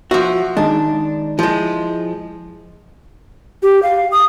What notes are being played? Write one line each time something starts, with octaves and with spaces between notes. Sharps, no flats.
F3 F#4 E5
D#3 G#3 D4 D#4
F3 G#3 E4
G4
F5
D#6